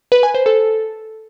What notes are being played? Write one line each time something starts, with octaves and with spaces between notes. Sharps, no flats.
B4
G#5
C5
A4